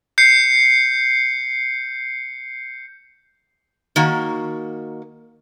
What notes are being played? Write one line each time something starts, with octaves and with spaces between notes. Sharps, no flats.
G6 C7 C#7
D#3 A#3 F#4